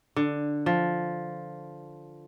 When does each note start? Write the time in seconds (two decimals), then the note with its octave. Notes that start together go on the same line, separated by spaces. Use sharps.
0.16 D3
0.66 F3